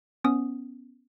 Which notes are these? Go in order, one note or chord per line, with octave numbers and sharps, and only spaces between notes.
B3 C#4 D#6